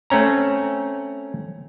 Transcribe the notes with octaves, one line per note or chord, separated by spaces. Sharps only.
A3 C4 C#4 A#5